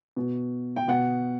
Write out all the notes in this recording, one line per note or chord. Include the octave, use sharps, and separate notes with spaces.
B2
G5
B2 F#5